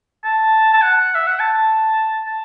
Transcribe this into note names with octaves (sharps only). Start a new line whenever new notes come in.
A5
A5
F#5
E5
F#5
A5
A5